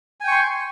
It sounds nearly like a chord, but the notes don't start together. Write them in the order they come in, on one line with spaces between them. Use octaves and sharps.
G#5 G5 C#6 C6